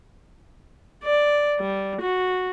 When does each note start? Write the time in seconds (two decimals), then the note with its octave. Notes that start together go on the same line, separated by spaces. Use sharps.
1.04 D5
1.60 G3
2.01 F#4